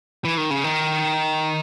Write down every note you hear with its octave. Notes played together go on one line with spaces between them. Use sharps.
E3
D#3
C#3
D#3